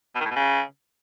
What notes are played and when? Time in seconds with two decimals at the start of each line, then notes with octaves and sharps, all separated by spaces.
0.15 B2
0.20 D#3
0.25 A2
0.31 B2
0.36 C#3